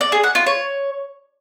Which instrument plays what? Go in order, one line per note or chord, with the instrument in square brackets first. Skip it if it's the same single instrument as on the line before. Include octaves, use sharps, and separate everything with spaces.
[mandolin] D5
G#4
F#5
F4
C#5